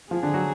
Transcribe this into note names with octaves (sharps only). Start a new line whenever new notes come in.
F3 F4 G#4
D3 D4
F#3 F#4